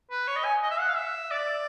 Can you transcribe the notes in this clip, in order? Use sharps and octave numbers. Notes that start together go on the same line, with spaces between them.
B4
C#5
D#5
G#5
D#5
E5
F#5
F5
E5
D5